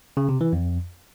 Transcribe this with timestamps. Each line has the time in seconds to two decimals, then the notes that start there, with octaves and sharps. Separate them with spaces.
0.17 C#3
0.29 C3
0.41 E3
0.53 F2